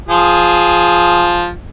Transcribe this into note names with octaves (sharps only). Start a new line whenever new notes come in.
F3 G#4